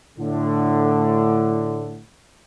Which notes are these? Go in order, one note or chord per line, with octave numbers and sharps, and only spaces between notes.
A2 D3